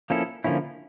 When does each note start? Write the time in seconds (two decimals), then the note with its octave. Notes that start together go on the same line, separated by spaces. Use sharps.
0.10 F3 A#3 C#4 E4 A4
0.44 D3 F3 A#3 C#4 E4